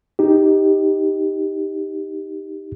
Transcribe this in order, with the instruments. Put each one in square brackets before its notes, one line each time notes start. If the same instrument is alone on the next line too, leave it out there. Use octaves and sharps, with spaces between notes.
[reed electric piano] D#4 G4